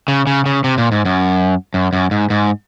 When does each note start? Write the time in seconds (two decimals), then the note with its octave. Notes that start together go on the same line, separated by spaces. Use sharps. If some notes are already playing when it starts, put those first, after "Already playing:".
0.08 C#3
0.27 C#3
0.46 C#3
0.64 C3
0.78 A#2
0.92 G#2
1.05 F#2
1.74 F#2
1.93 F#2
2.11 G#2
2.30 G#2